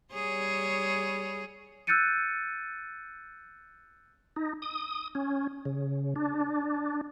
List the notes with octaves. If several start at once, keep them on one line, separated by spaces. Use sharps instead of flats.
G3 G#4 C#5
E6 F#6 G6 A6 C#7 D#7
D#4
D#6
C#4
C#3
D4